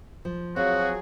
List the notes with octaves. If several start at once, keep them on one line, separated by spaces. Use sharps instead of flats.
F3
F3 F#3 C4 F#4 G#4 C#5 F5